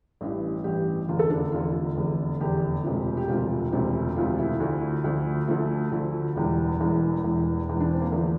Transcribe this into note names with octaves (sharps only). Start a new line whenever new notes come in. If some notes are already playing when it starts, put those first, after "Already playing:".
A1 G2 E3
A1 G2 E3 G4
F1 E2 D3 F4
A4
D4
F1 E2 D3 F4
F1 E2 D3
F1 E2 D3 G4
E1 D2 C3 F3
G4
E1 D2 C3 F3 F4
E1 D2 C3 F3
E1 D2 C3 F3 F4
E4
D2 D3 F3
D2 D3 F3
D2 D3 F3 A3
D2 D3 F3
E1 E2 E3 G3
E1 E2 E3
E1 E2 E3
E1 E2 E3
D4
C4
A#3
E2 D3 F3 A3